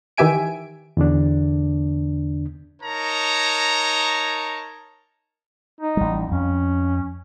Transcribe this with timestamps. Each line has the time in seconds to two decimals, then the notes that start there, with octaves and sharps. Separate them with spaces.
0.18 D#3 E3 G4 E5 G#5 D7
0.97 E2 D3 D4
2.81 D#4 A#4 C#5 A5 A#5
5.81 D#4
5.97 A1 G3
6.31 F2 C#4